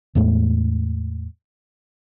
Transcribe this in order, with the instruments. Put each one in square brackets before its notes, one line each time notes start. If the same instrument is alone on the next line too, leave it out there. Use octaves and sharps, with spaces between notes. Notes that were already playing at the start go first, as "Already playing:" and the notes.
[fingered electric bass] E2 A2 G#3 A3